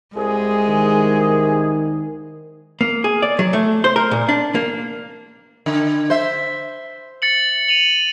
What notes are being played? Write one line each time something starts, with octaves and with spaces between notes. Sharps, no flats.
C2 G#3 G#4
D#3
A#3
G#4
D5
F#3
A3
C5
A#4
A#2
D4
A#3
D3
C5 E5
A6 C#7 F#7
D#7 F7 F#7